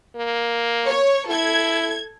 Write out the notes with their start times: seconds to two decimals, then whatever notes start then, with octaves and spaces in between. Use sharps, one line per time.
0.16 A#3
0.86 C#5
1.28 E4 A4 G#6